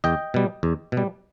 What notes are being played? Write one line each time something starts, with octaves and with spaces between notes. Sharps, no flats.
E2 D#5 G5
B2 G3
E2
B2
G3